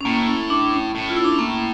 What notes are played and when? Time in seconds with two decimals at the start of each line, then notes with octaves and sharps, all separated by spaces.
0.01 C#4
0.05 A2 A#3
0.28 C#4
0.50 D4
0.73 C#4
0.95 A2
1.09 F4
1.17 E4
1.24 D4
1.32 C#4
1.39 A#3